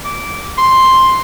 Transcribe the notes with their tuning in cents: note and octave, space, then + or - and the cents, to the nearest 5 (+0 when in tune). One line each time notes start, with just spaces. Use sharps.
D6 -15
C6 +5